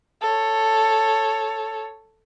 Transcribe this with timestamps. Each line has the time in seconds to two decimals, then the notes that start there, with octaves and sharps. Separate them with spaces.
0.22 A4 C#5